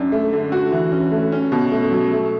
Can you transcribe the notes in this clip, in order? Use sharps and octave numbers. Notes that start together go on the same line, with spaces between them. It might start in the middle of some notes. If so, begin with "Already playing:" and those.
Already playing: F#2 D4
A3
D3
F#4
E3
C#4
A3
C#4
B2
A3
F#3
A3